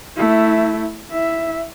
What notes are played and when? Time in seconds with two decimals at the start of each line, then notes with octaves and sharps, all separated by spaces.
0.17 A3 E4
1.10 E4 E5